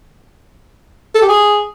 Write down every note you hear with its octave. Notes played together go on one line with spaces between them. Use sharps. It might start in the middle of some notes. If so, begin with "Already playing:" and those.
A4
G4
G#4